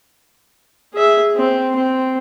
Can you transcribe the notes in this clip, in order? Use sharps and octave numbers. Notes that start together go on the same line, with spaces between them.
G#4 E5
C4
C4